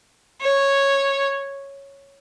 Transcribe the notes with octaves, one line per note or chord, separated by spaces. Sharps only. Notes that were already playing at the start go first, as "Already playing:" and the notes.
C#5